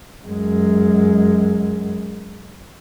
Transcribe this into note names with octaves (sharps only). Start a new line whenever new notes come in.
F#2 G#3